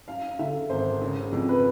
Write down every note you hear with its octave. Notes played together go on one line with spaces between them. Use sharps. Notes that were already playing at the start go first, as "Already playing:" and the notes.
F#2 F5
D3 E5
G#1 C5
C#3
F2
B4